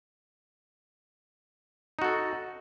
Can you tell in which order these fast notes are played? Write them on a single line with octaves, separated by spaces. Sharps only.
D#4 F#4 A4